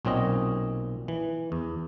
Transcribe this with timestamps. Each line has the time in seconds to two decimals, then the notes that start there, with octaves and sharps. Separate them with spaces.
0.05 B1 A#2 C4 C#4 D#5
1.08 E3
1.52 E2